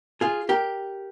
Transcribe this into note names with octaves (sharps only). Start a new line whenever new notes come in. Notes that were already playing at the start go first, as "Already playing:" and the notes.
F4 G#4
G4 A#4